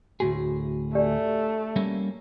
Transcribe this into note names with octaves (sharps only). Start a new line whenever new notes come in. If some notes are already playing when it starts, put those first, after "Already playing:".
D2 A2 F#4 G#4
A3 D4 G4 D5
G3 A#3 C#4